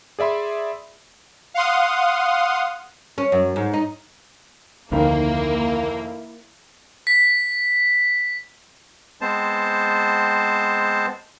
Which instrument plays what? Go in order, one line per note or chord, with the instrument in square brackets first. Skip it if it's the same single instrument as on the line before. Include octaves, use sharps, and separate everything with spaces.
[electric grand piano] G#4 D5 E5 B5 C6
[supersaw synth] F5 F#5 C6 D#6
[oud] C#4
F#2
G#2
D#4
[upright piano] F1 D#3 F5 [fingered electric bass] D2 [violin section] A#3 [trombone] E4
[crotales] B6
[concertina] G#3 B3 C4 C5 A5